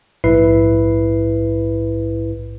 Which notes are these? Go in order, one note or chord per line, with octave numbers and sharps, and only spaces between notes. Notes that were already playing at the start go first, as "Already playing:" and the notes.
A#1 G#2 E4 B4 C7